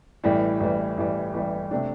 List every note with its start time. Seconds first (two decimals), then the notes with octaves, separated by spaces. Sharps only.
0.24 A1 A2 E3 G3
0.60 A1 A2 E3 G3
0.98 A1 A2 E3 G3
1.34 A1 A2 E3 G3
1.71 C3 A3 D4